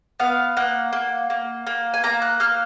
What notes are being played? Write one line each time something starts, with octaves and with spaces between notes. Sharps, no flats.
B3 F5
A#3 F#5
A#3
A#3
A#3
G#5
A#3 A#5
F#6
A#3 F6